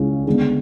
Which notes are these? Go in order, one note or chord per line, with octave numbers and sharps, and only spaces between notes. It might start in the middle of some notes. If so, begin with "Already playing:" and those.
Already playing: C#2 C#3 G#3 C#4 E4
D3 G#3 B3